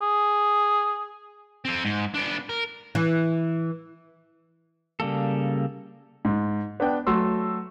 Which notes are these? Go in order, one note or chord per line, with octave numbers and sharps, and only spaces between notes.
G#4
C4 A4
G#2
B3 D4
A#4
E3
C#3 G3 A#3 A4
G#2
B3 D4 G5
F#3 A3 C6 E6